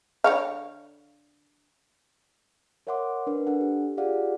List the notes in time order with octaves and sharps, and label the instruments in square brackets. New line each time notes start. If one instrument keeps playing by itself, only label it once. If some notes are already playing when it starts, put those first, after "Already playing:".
[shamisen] D3 C#5 F5
[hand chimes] A#4 C#5 E5 F#5 C6 D6
D4 A#4 B4
D4 A4 F#5
G4
F4 G4 G#4 D5 F5 F#5